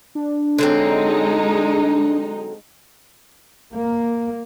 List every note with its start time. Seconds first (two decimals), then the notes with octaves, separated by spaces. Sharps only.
0.15 D4
0.58 D3 F#3 G#3 C4 D#4
3.73 A#3